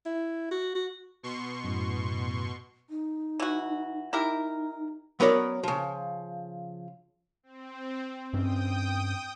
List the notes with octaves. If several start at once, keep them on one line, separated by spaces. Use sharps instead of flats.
E4
F#4
F#4
B2 C6 C#6
F#2 A2
D#4
E3 F#4
D#4 E4 G4 A#4
F#3 B3 C#4 A#4 C#5 D5
C#3 F3
C4
G2 C4 C#4 G5 D#6